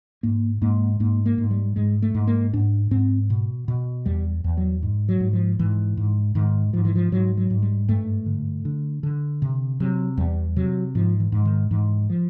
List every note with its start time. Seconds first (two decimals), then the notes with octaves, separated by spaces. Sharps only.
0.23 G#2 A#3
0.62 G#2 A#3
1.00 G#2 A#3
1.26 A#3
1.38 G#2
1.51 G3
1.76 G#2 G#3
2.02 A3
2.14 G#2
2.27 A#3
2.53 G#2 D4
2.91 G#2 C4
3.30 B2
3.68 B2
4.06 E2 G3
4.44 E2
4.57 F#3
4.82 G#2
5.09 F#3
5.20 G#2
5.33 F3
5.59 G#2 E3
5.97 G#2
6.35 G#2 D#3
6.73 G#2 F3
6.85 E3
6.95 F3
7.12 G#2 F#3
7.37 F#3
7.50 G#2
7.63 G3
7.88 G2 A3
8.26 D3
8.65 D3
9.03 D3
9.42 C3
9.80 C3 F#3
10.17 E2 G3
10.56 C3 F#3
10.95 G#2 F3
11.20 E3
11.32 G#2
11.45 D#3
11.71 G#2 E3
12.10 F3